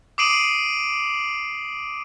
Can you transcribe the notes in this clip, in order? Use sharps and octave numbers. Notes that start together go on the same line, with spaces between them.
D6 D#6 C7 D7 D#7 F#7